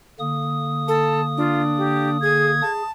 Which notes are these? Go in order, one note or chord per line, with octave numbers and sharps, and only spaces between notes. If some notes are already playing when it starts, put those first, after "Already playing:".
D3 A#3 D#6
A4 A5
D4 F4
G4
G#4 G#6
G#4 A5